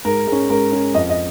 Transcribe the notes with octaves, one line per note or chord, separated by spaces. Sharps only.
G#2 A#4
G#3 C#4
G#2 A#4
G#3 C#4
F2 D#5
D#5